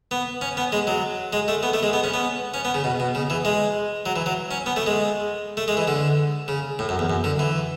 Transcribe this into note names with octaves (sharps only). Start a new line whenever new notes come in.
B3
C#4
B3
G#3
F#3
G#3
A3
B3
A3
G#3
B3
C#4
B3
C#4
B3
C#3
B2
B2
C#3
E3
G#3
F#3
E3
F#3
C#4
B3
A3
G#3
A3
G#3
E3
D3
C#3
A2
F#2
E2
F#2
D3
E3